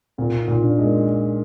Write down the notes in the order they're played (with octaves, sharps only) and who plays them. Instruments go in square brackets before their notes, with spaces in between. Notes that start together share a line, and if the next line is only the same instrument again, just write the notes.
[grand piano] A#2 [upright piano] C4
[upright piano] D#4
[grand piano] A#2
[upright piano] D4
[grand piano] G#3
[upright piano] A#3